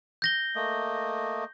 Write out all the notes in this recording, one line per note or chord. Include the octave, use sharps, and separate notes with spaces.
G6 A#6 G7
A3 A#3 D#5